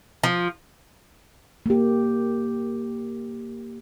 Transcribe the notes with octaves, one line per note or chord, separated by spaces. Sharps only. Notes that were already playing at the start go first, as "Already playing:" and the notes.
F3
A#3 G4